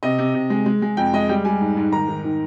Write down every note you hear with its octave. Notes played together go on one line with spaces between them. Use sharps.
C3 D#5
C3
C3
G#3
G#3
G#3
F2 G5
G#3 D#5
G3 G5
G3 G#5
G#2
G#2
D#3 A#5
D#3
D#3